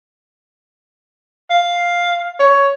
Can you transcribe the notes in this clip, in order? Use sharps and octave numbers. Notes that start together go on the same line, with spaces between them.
F5
C#5